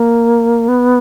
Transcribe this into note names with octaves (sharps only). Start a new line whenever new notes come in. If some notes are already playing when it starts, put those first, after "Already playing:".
Already playing: A#3
B3